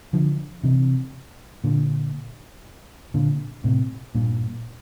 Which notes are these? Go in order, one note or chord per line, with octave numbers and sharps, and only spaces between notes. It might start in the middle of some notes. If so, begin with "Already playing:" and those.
D3 F3
C3 E3
A#2 D3
A#2 D3
A2 C3
G2 A#2